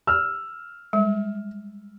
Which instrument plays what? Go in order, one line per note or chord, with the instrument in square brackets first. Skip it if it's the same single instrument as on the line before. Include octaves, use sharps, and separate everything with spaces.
[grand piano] E6 F6
[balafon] G3 G#3